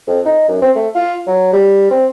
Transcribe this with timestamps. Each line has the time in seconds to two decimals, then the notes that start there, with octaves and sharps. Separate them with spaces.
0.07 F2
0.26 D#4
0.49 F#2
0.62 C4
0.76 A3
0.95 F4
1.27 F#3
1.53 G3
1.91 C4